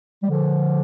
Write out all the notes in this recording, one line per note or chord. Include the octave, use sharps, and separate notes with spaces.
G3
D3 F3